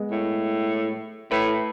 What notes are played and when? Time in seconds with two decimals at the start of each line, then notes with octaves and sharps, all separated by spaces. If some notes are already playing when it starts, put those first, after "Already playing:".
Already playing: G#3 B3
0.11 A2
1.31 A2 A3 E4 B4